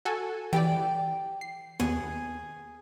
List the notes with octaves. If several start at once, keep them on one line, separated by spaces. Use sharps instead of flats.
F#4 A4 G#5
E3 G4 D5 G5
C7
D#2 B3 G#4